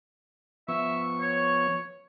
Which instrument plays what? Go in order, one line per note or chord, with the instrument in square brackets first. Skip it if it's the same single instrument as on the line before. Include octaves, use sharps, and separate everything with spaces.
[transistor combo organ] F3 B3 C#6 [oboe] E5
[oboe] C#5